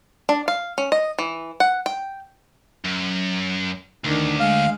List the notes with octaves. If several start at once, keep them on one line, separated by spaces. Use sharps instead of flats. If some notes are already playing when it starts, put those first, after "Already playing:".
D4
F5
C#4
D#5
E3
F#5
G5
F#2
D2 D#3 D4
G#3 F5